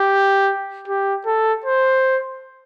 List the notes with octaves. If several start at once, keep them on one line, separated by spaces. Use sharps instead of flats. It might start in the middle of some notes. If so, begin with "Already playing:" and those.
Already playing: G4
G4
A4
C5